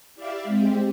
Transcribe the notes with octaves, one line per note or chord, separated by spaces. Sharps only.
E4 G4 D5 E5 F5
G#3 C4 G4